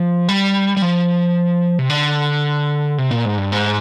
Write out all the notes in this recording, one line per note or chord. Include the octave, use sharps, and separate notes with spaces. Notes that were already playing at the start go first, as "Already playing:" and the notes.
Already playing: F3
G3
G3
F3
C3
D3
C3
A#2
G#2
G2
G#2